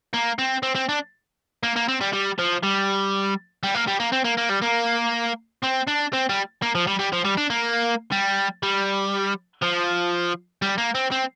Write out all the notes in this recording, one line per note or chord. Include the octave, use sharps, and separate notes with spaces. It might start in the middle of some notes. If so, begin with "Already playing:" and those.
A#3
C4
C4
C4
D4
A#3
A#3
C4
G3
G3
F3
G3
G3
A#3
G3
A#3
C4
A#3
A#3
G3
A#3
C4
D4
C4
G3
A#3
F3
G3
G3
F3
G3
D4
A#3
G3
G3
F3
G3
A#3
C4
C4